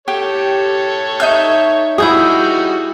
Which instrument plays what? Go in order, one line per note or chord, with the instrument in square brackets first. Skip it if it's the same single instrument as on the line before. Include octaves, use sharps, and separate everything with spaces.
[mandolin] G4 [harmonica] A4 C#5
[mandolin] D#4 E5 G6
[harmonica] G3 D#4 F#4 [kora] E4 G#4 [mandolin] D#6 G6